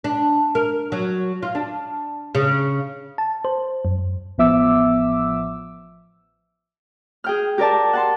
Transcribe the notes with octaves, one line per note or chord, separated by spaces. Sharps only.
D4
A#4
F#3
F4
D4
C#3
A5
C5
F#2
A1 F3 B3 E5 D6 E6
G#4 G5 F6
G4 A#4 D5 A5
F#5 A5 C6